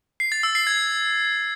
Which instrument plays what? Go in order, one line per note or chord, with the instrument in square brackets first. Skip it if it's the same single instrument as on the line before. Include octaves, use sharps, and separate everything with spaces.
[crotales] C7
A6
E6
C7
G#6